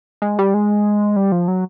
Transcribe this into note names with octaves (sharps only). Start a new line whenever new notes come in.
G#3
G3
G#3
G3
F3
F#3